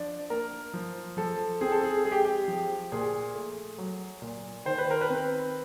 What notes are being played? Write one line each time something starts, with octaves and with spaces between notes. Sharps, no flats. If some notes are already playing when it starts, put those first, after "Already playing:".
Already playing: F3 D4 D5
A#3 A#4
F3
F3 A4
C4 G#4
A4
G#4
G#3 G#4
G4
G4
F3
A#2 G#4
A3
F#3
A#2
D#3 C5
B4
A#4
B4
C4